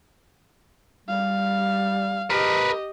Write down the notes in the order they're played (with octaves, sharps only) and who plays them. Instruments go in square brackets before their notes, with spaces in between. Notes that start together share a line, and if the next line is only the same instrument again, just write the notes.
[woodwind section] G3 [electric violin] F5
[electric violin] G4 D#5 [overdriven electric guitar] A#4 B4